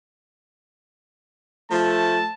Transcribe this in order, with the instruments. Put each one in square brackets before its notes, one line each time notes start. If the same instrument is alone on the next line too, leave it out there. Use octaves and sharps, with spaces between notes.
[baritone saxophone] F3 [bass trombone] A3 [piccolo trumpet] A5